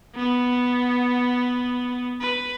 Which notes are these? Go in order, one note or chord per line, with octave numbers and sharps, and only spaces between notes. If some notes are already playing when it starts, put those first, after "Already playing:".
B3
B4